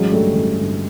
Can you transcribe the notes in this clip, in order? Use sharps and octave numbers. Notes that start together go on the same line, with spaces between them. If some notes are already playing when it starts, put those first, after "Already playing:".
Already playing: A1 F#3 G#3
G2 D3 G3 A3
A1
G2 D3